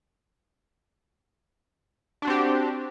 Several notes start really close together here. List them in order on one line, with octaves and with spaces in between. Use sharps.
D4 F#4 C4 G4